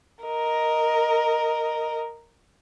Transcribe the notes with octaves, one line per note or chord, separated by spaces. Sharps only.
A#4 D#5